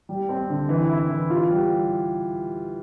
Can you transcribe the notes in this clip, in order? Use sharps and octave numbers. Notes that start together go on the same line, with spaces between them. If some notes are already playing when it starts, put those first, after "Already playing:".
G3
C4
D3
E3
E4
E3
F4
G3